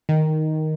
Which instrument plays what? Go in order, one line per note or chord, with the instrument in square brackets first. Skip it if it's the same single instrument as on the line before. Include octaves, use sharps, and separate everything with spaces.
[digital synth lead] D#3